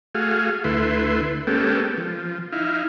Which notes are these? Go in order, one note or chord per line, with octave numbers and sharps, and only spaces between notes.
A3 F#4 G#4 F5
D2 A3 E4 B4 C6
G#3 A#3 B3 C#4 G4 A4
F3
D#4 E4 F5